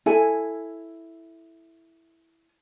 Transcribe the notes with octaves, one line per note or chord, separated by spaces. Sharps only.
E4 A4 G#5